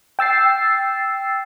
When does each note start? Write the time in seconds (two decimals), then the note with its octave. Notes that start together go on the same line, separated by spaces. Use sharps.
0.19 G5 E6 A6 C7